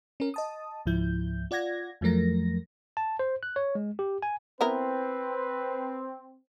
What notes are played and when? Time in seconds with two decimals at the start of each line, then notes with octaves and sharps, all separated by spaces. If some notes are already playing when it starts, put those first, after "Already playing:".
0.20 C#4 A#4
0.34 D#5 A5 D#6
0.86 C#2 G#2 F3 E4 G6
1.51 F4 D5 F#5 G#6 A#6
2.01 F2 F3 F#3 A3 A#4 A#6
2.97 A5
3.19 C5
3.43 F#6
3.56 C#5
3.75 G#3
3.99 G4
4.22 G#5
4.61 B3 C4 E4 A#4 B4